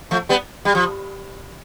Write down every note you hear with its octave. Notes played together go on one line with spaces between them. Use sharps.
F3 A3
G3 B3
G3
F3